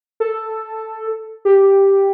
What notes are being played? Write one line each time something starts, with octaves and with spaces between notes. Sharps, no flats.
A4
G4